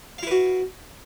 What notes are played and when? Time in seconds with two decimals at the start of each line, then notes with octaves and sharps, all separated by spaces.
0.18 F5
0.23 E4
0.27 B4
0.31 F#4